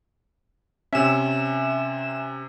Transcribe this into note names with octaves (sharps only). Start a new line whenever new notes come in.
C3 C#4 E5 G#5 E7